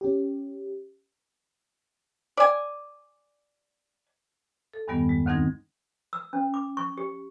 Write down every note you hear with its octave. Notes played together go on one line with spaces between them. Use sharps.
C#4 G4
D5 G#5
A4
E2 G2 D#3 G3 B3
G#3
D2 D#3 C4 D#4 G#6 A#6
E6
C#4
D6
C#6
G4